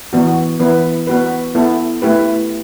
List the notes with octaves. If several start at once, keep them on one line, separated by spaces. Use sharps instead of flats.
E3 B3 F#4
E3 B3 E4 B4
B3 F#4 B4
B3 E4 A4
A3 E4 G4 B4